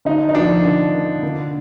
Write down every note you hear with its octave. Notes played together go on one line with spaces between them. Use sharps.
D3 D#4
D#4
F3 D4
D3
D3
D3